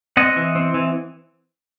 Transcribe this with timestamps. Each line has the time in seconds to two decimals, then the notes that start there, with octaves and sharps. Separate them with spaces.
0.17 C4 D#5 F#5
0.36 E3
0.55 C4
0.74 E3